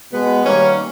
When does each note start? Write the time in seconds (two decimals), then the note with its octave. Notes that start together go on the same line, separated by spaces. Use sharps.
0.11 B2 G#3 B3
0.44 D#3 G3 A#3 C#4